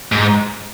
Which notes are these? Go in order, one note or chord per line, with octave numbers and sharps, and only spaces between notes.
G#2